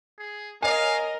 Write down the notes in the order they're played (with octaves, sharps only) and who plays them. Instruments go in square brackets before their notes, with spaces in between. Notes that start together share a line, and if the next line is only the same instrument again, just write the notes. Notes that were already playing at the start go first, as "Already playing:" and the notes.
[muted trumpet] G#4
[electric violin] A#4 [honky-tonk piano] C#5 G#5 [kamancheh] D#5 [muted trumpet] F5